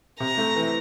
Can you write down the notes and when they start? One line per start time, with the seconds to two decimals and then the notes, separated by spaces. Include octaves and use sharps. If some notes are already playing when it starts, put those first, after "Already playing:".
0.20 C3 A#5
0.38 A3
0.55 E3